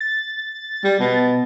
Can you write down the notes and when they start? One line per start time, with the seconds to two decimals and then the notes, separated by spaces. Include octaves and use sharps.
0.01 A6
0.84 G3
1.00 B2